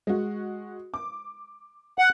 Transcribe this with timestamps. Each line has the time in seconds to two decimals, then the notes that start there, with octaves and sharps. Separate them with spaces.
0.07 G#3 F#4
0.94 D6
1.99 F#5